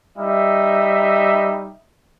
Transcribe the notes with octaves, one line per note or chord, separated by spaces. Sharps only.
G3 D#4 E5